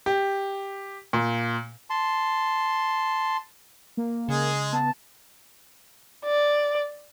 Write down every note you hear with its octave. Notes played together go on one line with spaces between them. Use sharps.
G4
A#2
A5 C6
A#3
C#3 G#3 G#4
B3 A5
D5